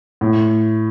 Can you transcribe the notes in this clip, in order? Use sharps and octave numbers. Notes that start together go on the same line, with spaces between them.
A2